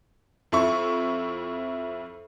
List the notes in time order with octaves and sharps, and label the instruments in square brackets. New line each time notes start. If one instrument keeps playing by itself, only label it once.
[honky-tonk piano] F2 E4 C#6